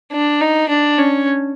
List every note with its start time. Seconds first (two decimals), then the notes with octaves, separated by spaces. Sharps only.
0.12 D4
0.41 D#4
0.69 D4
0.98 C#4